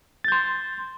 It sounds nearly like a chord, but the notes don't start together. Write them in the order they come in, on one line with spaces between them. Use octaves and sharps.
A6 G6 C6